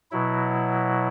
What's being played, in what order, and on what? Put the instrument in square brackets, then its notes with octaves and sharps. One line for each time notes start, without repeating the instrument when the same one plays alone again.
[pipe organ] B2 F#3 E4